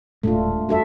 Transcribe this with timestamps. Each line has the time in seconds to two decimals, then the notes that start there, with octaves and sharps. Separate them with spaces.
0.23 D#1 A2 G#3 A3 D4 F4
0.69 F2 G3 D4 F#4 A4 E5